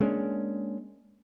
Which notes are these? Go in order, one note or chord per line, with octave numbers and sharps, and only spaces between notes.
G#3 A#3 C#4 D4